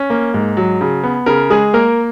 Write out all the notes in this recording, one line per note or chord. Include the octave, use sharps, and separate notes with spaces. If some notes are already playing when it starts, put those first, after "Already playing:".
Already playing: C#4
A#3
G#2
F#3
C#3
B3
C#3 A#4
G#3 G#4
A#3 A#4